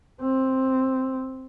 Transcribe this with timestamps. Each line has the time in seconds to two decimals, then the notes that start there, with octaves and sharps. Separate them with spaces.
0.21 C4